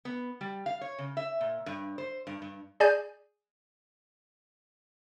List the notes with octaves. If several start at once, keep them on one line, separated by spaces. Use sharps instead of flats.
B3
G3
F5
C#5
C#3
E5
A#2
G2
C5
G2
G2
G#4 D5 G#5 G6